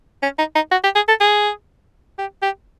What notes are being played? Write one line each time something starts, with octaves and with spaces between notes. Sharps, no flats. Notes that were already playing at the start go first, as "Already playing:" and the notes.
C#4
D#4
D#4
F#4
G4
G#4
A4
G#4
G4
G4